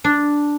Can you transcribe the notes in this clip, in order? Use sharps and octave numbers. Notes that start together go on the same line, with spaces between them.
D4